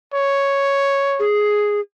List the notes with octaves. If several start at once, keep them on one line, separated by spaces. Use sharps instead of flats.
C#5
G#4